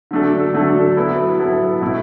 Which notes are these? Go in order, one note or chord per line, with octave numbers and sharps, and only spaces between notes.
D3 F#3 A3 D4 A4
D3 F#3 A3 D4 A4
F#3 B3 E4 A4
F#3 B3 E4 A4
B2 A3 E4